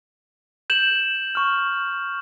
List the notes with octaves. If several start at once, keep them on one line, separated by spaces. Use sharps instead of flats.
G6 E7 F#7
C#6 F6